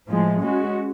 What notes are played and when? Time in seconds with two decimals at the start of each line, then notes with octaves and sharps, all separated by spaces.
0.09 A2 F3 G#3
0.42 G#3 C#4 F#4